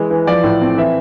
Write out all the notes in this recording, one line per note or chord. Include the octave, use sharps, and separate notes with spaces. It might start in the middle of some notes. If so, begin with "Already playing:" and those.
Already playing: E3 G#3
E3
F3 D5
A2
C4
E3 E5